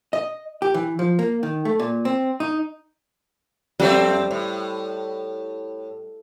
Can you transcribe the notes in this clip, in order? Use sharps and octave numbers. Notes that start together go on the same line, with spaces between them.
D#5
G4
E3
F3
A#3
D#3
A3
A#2
C4
D#4
F2 G3 A3 C4
A2